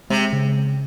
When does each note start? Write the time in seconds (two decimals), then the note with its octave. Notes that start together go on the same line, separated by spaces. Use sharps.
0.10 C3 G#3
0.33 C#3